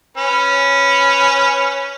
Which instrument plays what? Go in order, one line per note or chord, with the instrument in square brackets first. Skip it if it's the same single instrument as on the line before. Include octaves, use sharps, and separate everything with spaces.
[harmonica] C#4 B4